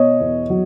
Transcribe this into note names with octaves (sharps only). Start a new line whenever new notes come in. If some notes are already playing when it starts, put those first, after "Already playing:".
Already playing: B2 C#5 D#5
E2
F#3